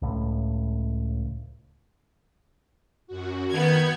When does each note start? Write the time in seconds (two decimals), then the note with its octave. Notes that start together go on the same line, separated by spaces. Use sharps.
0.02 C#2 A2
3.07 F#2 F#4
3.50 D#3 B3 D#6 G6 G#6